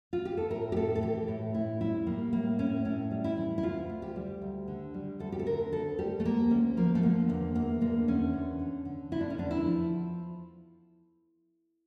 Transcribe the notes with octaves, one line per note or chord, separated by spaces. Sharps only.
F4
G4
A4
A2 A#4
G4
A2 A4
A4
E3 G4
A2
A2 E4
G3 E4
G3 A#3
A2 A#3
A2 C#4
A2 C#4
G3
E4
E3
E4
D2 F4
D2
G4
G3
D2
D3
G3
D2 A4
G4
A4
D3 A#4
D2 A4
G3 G4
A3
D2 A#3
D2 C#4
F3 A#3
A3
D3 A#3
E2 A#3
E2 A#3
D3 A#3
E2 C#4
D3
D3
D3
D3 E4
D4
C#4
E2 D4
E4
F3